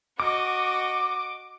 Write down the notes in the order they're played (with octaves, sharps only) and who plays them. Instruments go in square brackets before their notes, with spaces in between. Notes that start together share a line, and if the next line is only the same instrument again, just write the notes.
[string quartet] F#4 D#5 [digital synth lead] D6